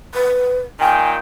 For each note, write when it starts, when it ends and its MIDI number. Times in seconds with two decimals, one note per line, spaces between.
0.15 0.59 71
0.80 1.18 46
0.80 1.18 51
0.80 1.18 79
0.80 1.13 80